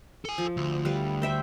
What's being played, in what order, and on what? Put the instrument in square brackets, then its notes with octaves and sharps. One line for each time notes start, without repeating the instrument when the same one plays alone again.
[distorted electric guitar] A4 G#5
[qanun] F3
[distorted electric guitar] D2
[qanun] G3 B4 F5
C5 E5 G5